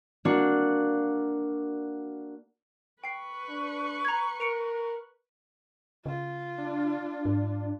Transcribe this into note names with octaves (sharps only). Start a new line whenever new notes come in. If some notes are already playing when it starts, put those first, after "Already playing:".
A#3 D4 F#4
B4 G5 C#6 C7
D4
A#5 G#6
A#4 C#7 D7 F7
C#3 F4
D4
G#2